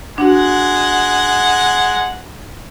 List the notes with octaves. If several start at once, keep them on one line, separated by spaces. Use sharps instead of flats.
G#3 D4 F#4 F#5